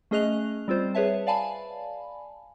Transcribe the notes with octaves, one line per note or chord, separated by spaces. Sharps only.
A3 C#4 G#4 D#5 F#6 F7
G3 C4 F4 C5
G#4 B4 C#5 E5 A5
D5 F5 G#5 A5 B5